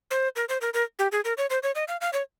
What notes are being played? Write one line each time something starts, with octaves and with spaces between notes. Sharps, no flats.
C5
A#4
C5
A#4
A#4
G4
G#4
A#4
C#5
C5
C#5
D#5
F5
F5
C#5